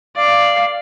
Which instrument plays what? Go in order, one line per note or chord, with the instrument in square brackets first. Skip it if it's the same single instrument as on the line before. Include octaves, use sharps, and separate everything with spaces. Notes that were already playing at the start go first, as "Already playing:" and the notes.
[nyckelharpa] D5 [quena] F5